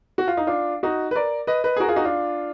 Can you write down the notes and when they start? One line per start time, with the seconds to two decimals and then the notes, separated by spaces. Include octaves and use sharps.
0.18 F#4
0.28 F4
0.37 D#4
0.47 D4 F4
0.83 D#4 F#4
1.11 B4
1.16 A#4 D5
1.47 B4 D#5
1.64 B4 D#5
1.77 G#4
1.80 F#4 A#4
1.89 F4 G#4
1.96 D#4 F#4
2.05 D4 F4